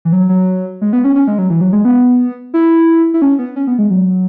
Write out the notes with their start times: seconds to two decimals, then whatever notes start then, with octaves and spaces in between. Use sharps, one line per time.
0.05 E3
0.12 F#3
0.29 F#3
0.81 G#3
0.93 B3
1.04 C#4
1.16 C#4
1.27 G#3
1.38 F#3
1.50 E3
1.61 F#3
1.73 G#3
1.85 B3
2.54 E4
3.14 E4
3.22 C#4
3.39 B3
3.56 C#4
3.67 B3
3.79 G#3
3.90 F#3